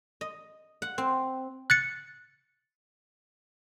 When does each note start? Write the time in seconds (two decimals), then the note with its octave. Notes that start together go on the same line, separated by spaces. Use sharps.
0.21 D#5
0.82 F#5
0.98 C4
1.70 F#6 A6 C#7